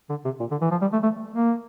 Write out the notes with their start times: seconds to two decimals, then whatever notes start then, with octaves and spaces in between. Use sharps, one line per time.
0.09 D3
0.25 C3
0.40 A#2
0.51 D3
0.61 E3
0.71 F3
0.81 G3
0.93 A3
1.03 A3
1.34 A#3